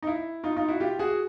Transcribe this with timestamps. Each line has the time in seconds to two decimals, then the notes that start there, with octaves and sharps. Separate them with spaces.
0.03 D#4
0.07 E4
0.44 D#4 F4
0.56 D#4 F4
0.68 E4 F#4
0.80 F4 G4
0.99 F#4 G#4